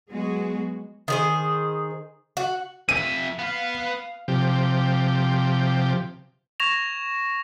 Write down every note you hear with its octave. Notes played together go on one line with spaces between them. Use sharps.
F#3 G#3 B3 F#4 G#4
D#3 G#4 C5
F#4
F2 E5 D#7
B3 B4 F5
C3 F3 G4
C#6 G#6 A#6 E7 F7